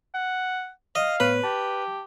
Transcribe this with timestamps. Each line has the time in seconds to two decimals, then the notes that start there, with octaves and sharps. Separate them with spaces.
0.14 F#5
0.95 D#5 F5
1.20 A2 B3 B4 C#5
1.44 G4 A5